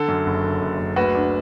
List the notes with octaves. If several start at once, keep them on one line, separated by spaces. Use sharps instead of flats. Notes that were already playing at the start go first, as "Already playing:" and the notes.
Already playing: D3 A4
F#2
F#1
D3
F#1
F#1
D2 F#4 B4
D4